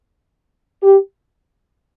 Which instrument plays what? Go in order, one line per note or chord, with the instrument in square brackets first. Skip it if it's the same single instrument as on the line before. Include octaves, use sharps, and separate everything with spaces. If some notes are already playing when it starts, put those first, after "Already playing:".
[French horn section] G4